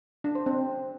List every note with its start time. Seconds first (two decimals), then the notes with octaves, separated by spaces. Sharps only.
0.24 D4
0.35 C5
0.46 C4